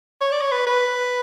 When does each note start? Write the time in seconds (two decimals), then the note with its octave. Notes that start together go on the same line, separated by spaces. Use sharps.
0.21 C#5
0.32 D5
0.41 C#5
0.52 B4
0.67 B4